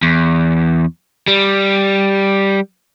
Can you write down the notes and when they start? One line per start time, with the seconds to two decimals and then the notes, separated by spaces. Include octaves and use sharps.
0.02 E2
1.28 G3